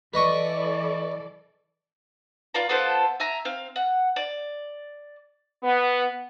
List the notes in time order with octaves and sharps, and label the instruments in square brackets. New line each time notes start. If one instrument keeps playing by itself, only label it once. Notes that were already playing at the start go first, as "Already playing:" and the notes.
[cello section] E3 A4 D5 [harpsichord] B4 D#5 C#6
[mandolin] F4 B4 D5 A#5
B3 F4 A4 C5
E5 G#5 A#5
C4 F5
F#5
D5
[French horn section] B3